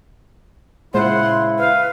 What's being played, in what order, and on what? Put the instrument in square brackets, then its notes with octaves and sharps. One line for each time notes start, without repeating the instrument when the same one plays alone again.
[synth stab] A#2 G#3 C5 [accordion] C#3 E4 [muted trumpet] F#5 [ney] C6
[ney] B4 [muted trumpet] F5